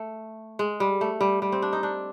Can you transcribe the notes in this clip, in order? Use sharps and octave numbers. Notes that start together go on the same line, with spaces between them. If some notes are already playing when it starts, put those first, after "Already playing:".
Already playing: A3
G#3
G3
A3
G3
G3
C4
D4
D#4
D4